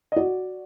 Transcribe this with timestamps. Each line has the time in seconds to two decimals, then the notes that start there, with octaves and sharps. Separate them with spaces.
0.12 D#5
0.16 F#4 D5